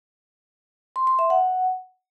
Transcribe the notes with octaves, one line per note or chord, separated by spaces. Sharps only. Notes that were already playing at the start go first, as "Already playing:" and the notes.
C6
C6
E5
F#5